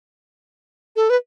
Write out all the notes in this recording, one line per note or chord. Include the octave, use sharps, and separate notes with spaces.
A4
B4